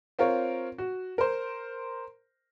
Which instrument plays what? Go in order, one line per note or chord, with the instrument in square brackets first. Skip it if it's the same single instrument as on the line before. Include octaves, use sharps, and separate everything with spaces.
[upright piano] C4 F4 A#4 C#5
F#4
A#4 C5